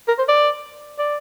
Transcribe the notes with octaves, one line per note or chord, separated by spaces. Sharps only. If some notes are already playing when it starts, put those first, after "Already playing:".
A#4
C5
D5
D5